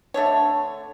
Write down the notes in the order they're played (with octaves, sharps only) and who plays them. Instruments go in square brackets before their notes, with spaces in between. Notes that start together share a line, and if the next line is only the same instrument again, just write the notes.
[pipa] D3 A3 D4 C#5